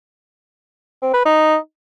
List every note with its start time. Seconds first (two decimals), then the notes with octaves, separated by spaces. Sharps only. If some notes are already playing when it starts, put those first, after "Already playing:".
1.02 C4
1.14 B4
1.25 D#4